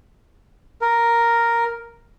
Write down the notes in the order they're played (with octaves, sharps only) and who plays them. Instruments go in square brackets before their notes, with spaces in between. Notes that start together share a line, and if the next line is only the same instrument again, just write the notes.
[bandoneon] A#4